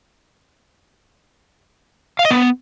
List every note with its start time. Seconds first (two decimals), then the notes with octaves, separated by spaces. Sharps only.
2.19 F5
2.25 D#5
2.31 B3